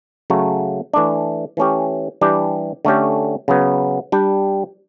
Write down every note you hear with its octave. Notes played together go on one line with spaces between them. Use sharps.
C#3 F#3 A3
E3 A3 D4
E3 A3 C#4 G4
E3 G3 D4 G4
D3 A3 C#4 G4
C#3 F#3 B3
G3 D4 G4